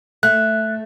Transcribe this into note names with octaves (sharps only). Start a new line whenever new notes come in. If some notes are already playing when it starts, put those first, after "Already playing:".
A3 F#6